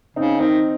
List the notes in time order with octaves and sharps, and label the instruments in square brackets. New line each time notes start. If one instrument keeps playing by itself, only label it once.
[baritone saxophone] C#3 [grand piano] C4 D#4
[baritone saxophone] D#3 [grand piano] C4 D#4